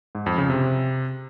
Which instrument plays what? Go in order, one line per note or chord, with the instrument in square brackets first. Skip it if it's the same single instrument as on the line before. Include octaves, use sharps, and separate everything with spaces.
[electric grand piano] G#2
F2
C#3
C3